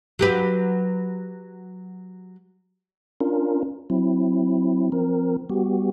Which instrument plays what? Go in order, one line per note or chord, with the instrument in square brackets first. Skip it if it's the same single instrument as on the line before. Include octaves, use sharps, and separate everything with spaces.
[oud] F#3 G4 B4
[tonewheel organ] C#4 D4 F4 A#4
F#3 C4 E4
F3 C4 A#4
G3 B3 F#4 G4